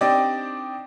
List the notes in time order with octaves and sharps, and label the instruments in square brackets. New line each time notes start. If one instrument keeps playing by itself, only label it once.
[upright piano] C4 D4 D#4 G4 D5